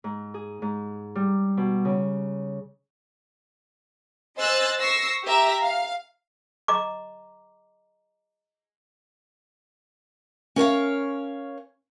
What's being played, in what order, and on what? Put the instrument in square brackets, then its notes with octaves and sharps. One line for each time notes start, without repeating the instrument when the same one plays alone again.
[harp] G#2
G#4
G#2
G3
B2
C#3
[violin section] C5 D#5 G#5 E6 F#6 A6
C#6 E6 A#6 C7
G4 E5 A#5
F5
[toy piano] D#5 A#5 D6
[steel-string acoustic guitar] C#4 A#4 C#5 F5